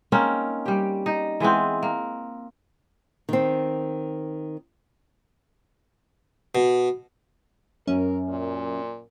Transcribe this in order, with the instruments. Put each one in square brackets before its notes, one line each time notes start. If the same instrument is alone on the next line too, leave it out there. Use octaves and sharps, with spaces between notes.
[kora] A#3 C4 C#4 D#4
G3 G4
D#4
E3 G#3 B3 C4
A#3
[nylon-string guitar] D#3 C4
[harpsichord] B2
[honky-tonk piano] F#2 [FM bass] C#4 [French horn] A#4
[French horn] A#2